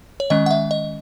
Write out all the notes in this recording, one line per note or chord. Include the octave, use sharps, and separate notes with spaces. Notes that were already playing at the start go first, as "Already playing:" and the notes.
C#5
D#3 G#3 C#4 D#5
F#5
E5
D#5